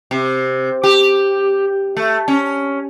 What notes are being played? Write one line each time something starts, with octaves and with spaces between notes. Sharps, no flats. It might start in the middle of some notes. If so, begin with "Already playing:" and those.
C3
G4
A3
C#4